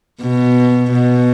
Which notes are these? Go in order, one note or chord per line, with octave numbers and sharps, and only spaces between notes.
B2
B2